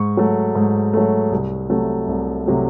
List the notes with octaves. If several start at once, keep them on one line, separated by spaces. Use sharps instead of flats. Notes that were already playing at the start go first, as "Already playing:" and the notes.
Already playing: G#2 C#6
F#3 A3
G#2
F#3 A3
C2
C3 F#3 A3
C2
C3 F#3 A3